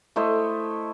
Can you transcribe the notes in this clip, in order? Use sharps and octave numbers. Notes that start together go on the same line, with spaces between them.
A3 E4 C5 D#5